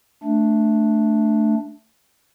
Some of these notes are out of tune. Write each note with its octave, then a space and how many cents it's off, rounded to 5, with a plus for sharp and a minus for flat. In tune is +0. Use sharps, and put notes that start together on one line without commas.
A3 +0 D4 +0